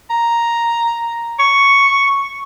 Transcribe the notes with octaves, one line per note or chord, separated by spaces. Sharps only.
A#5
C#6